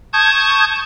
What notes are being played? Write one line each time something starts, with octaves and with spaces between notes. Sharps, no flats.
A5 C#6 D#6 G6 G#6